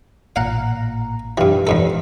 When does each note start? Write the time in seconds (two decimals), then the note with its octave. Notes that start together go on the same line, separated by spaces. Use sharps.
0.36 A1 A#2 F5 F#5 A#5
1.38 G2 E3 G4 F5
1.67 E2 G#2 A4